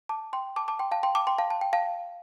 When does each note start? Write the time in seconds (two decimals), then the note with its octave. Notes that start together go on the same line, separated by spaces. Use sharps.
0.09 A5 D6
0.33 G5 C6
0.56 A5 D6
0.68 A5 D6
0.79 G5 C6
0.91 F5 A5
1.03 G5 C6
1.15 A5 D6
1.27 G5 C6
1.38 F5 A5
1.50 A5
1.61 G5
1.73 F5 A5